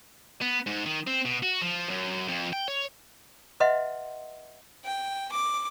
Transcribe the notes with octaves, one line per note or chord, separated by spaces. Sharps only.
B3
G#2
D#3
C4
B2
F#4
F3
F#2
F2
G5
C#5
B4 D#5 E5 F#5 C6
G5
D6